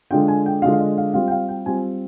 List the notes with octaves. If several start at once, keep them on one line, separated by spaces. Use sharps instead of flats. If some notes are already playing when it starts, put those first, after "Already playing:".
D3 G#3 D4 F4 G5
G#5
G5
D3 G#3 D4 F4 F5
F5
D#5
F5
G3 C4 F4 F5
G5
F5
G5
G3 C4 F4 G#5